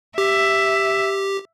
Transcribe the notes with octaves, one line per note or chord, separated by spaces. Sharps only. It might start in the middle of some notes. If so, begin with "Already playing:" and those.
G4 E5